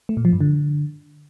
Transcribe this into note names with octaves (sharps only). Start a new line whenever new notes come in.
A3
A#2
F3
G2
D3